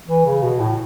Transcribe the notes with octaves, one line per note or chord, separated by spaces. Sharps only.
E3
C#3
B2
A2